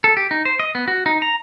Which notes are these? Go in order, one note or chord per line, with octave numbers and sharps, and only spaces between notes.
A4
G4
D#4
C5
D#5
B3
F#4
D#4
A#5